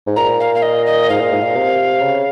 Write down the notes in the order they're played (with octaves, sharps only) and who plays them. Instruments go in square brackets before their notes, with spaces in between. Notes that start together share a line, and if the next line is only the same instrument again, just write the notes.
[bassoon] G#2
[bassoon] A#2 [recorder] A#5
[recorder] F5
F5
D#5
D#5
[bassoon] G#2 [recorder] F5
[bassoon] A#2
G#2
A#2
C3
C#3